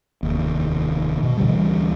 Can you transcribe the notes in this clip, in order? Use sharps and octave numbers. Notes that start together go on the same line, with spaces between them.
F1 D#2
B2
D2 D3 E3 G3